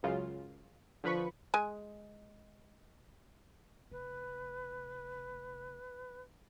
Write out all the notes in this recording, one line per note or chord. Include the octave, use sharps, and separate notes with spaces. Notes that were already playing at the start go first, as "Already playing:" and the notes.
C#2 F#2 C#3 F4
D3 F3 B4 B5 C#6
G#3 G#5
F1 B4